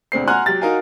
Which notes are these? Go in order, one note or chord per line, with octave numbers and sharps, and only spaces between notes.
E1 D2 C4 C7
F#5 G#5 A#5 C6 F6 F#6
F#3 G4 A6
D#4 F#4 A#4 F5 G#5